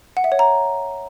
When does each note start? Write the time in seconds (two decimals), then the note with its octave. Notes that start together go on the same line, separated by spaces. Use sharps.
0.17 F#5
0.24 E5
0.32 C#5
0.39 A#5